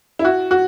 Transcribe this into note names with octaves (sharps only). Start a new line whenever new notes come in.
E4
F#4
F#4